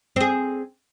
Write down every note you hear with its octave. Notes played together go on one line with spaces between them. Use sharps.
C4 G#4